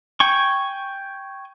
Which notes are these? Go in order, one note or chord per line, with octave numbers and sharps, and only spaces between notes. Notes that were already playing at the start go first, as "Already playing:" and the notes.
G5 G#5 C#6